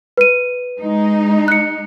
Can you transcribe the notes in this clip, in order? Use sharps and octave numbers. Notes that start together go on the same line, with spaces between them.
B4 D#7
G#3 D#4
F#6 C#7